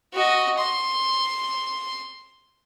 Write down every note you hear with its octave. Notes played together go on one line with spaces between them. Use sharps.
F#4 D#5
C6